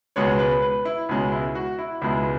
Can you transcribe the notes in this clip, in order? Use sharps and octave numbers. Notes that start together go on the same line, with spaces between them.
C#2 B2 G#3 B3 C#5
B4
B4
E4
C#2 B2 G#3 B3 C#4
E4
F#4
E4
C#2 B2 G#3 B3 E4